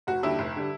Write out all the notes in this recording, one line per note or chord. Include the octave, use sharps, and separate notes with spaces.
F1 F#4
D#2 D3 G3 E4
F1
D3 G3